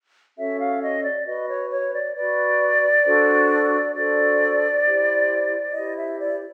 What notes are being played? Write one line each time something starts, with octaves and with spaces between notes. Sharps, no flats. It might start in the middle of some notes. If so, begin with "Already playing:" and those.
C#4 F#4 A4 C#5 E5
F5
D#5
D5
F#4 B4 D#5
C#5
C#5
D5
F#4 B4 D5
D4 F#4 A4 C5
D4 F#4 A4 C5 D5
E4 G4 C5
E4 G4 C5 D#5
E5
D5